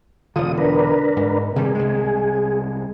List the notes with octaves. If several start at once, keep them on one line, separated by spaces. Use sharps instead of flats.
E1 D3 F4 D#6
D4 A#4 B4
G#2
C3 D#3 G3 G#4
C2 G#3